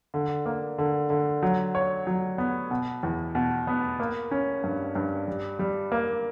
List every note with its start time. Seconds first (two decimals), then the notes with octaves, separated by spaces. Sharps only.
0.14 D3
0.46 A#3
0.78 D3
1.10 D3
1.43 F#3
1.75 C#5
2.07 F#3
2.38 B3
2.71 B2
3.03 E2
3.35 B2
3.67 B3
4.00 A#3
4.31 C#4
4.64 G2
4.95 G2
5.28 G3
5.59 G3
5.92 A#3